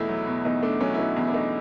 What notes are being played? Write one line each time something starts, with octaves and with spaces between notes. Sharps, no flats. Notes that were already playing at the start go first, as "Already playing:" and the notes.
Already playing: E2 B2 A3 D#4 E4
F#3
B2
E2 D#4
A3 D4
F#3 C#4
E4
B2 D#4
E2
D4
A3 D#4